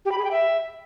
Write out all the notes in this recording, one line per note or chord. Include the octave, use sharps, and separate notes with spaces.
G4
B5
G#4
G5
E5